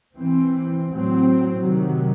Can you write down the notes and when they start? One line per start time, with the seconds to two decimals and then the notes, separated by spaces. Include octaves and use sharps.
0.15 E3 C4
0.88 A2 F#3 C4
1.60 C3 D#3 F#3